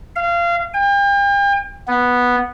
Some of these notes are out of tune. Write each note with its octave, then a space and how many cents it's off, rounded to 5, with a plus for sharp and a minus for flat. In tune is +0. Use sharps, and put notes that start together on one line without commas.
F5 -25
G5 +40
B3 -5